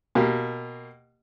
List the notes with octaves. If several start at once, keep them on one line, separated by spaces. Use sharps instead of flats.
B2 A#3 G4